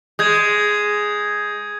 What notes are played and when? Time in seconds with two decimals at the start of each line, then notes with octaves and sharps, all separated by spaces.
0.19 G#3 D#6 G6 G#6